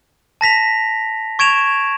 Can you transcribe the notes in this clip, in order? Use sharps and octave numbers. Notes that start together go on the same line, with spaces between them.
A5 A#6 B6 F7
C#6 G#6 D7 E7 F7